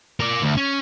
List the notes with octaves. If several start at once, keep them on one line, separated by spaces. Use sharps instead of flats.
A#4 D5
D2
C#4